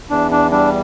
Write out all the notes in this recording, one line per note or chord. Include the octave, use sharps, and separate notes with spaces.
E2 D4
D4
G3 D4